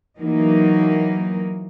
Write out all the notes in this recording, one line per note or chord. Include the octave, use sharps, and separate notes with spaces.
E3 F#3 A#3 D#4